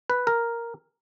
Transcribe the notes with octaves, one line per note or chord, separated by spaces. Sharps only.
B4
A#4